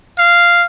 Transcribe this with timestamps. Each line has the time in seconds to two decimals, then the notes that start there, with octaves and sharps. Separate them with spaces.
0.19 F5